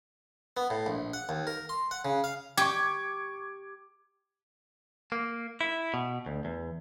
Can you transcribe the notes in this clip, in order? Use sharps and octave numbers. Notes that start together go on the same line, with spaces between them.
B3
A2
A#1
F#5
D#2
A#4
C6
F#5
C#3
F5
G4 C#6 D6 G#6
A#3
E4
B2
D2
E2